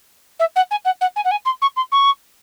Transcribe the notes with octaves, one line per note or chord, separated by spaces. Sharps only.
E5
F#5
G#5
F#5
F#5
G#5
F#5
G#5
C6
C#6
C6
C#6